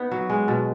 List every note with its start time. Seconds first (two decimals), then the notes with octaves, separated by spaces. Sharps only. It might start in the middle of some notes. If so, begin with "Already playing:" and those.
Already playing: B3 D#4
0.11 F#3
0.30 G#3
0.48 B2